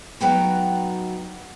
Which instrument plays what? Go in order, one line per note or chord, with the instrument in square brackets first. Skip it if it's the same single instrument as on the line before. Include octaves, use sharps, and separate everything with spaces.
[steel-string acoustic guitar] F#3 B3 D#4 F#4 G5 A#5